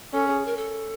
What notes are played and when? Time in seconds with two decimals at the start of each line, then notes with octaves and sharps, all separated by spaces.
0.13 C#4 A4
0.28 G#4
0.46 A#4
0.57 A4